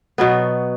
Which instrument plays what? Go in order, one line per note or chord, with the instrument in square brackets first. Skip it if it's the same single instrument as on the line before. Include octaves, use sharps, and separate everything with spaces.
[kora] B2 F#3 B3